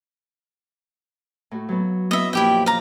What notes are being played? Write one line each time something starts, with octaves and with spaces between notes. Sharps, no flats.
A2 F#4
F#3 B3
B3 C#4 E4 D#5 E5
F2 A#2 F3 E4 G4 G5
F5 A#5